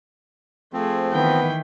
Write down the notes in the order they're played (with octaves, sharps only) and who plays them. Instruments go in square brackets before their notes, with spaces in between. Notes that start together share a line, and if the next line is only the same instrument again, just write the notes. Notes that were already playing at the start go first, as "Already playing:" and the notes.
[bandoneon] F3 C4 [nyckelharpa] A3 G#4 [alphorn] C5
[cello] D#3 E3 [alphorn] B3 [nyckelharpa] G5